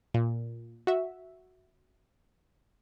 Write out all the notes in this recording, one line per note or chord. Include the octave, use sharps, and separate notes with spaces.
A#2
F#4 E5